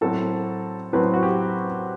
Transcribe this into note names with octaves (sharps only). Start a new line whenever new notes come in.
A2 F#3 C4 A4
A2 F#3 C4 B4
F#4
G4